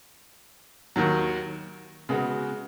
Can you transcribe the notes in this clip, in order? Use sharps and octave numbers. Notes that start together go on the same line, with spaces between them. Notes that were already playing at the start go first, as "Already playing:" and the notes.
D#2 D#3 F#3
C#3 G#3 B3 F#4